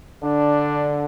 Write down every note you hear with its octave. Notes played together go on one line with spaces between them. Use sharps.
D3 D4